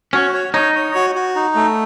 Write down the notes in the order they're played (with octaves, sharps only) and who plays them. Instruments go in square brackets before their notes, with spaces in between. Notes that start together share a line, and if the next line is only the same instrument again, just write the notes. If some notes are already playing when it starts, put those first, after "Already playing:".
[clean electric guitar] C#4 [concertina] F#4
[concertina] C#5
[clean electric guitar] D#4 [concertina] C#5
[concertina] C#5
F#4
F#4
D#4
A3